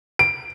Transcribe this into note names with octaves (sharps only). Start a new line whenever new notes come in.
D7